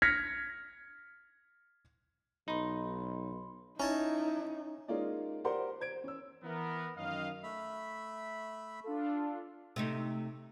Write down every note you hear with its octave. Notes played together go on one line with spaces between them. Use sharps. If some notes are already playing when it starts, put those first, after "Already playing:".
F6 G#6 A#6 B6 C#7
B1 D#4 B5 C6
C#4 D#4 E4 C#5 A5 A#5
G#3 A#3 C#4 D#4 F4 D5
G4 A#4 C5 D5 F#5 C6
C5 G#6 D7
C#4 E6
E3 B3 A#4
F#2 D#3 D#5 F5
A3 E5 B5
D4 F4 A4
C3 A3 D#4